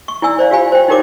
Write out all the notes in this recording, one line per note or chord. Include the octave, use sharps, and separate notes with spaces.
C#6
E4 D5 G#5 E6
C5 D5 F5
F4 G4 F5 G#5 B5
C5 G5
D#4 E4 G4 A#4 C#5 D6